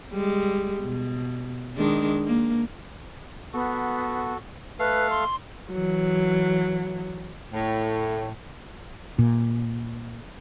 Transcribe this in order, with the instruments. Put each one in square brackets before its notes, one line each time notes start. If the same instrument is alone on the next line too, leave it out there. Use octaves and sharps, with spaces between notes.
[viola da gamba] G3 G#3
B2
D#3 G#3 D4
A#3
[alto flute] B3 [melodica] F#4 A4
[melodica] A3 A4 F5 [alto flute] B4
[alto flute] C6
[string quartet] E3 F#3
[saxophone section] A2
[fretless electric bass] A#2